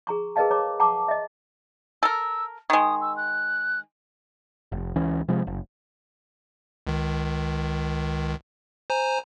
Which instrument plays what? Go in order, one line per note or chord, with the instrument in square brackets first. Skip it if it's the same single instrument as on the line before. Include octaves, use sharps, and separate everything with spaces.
[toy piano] G#4 A#5 C#6
G#4 A#4 B4 D#5 F5 A5
G#4 C#5 A#5 D6
F#5 A5 A#5 C#6 D6
D#5 E5
[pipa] A4 A#4 [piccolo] E6
[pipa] D#3 G#3 [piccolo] D#6
[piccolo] E6
F#6
[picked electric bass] F1
C#2 E3 C#4
C3 F3 G#3
F#1
[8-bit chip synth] C#2 D#3
C5 G#5 A#5